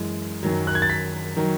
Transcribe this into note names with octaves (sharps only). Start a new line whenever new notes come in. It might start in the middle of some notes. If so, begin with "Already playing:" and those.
Already playing: F#2 E3 G#3
F#2 D#3 F#3
F#6
G#6
A6
B6
D#3 F#3